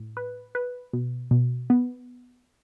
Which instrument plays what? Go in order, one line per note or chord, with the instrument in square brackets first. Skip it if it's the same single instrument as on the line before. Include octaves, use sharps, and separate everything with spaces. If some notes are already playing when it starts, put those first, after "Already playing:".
Already playing: [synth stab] A2
B4
B4
B2
B2
B3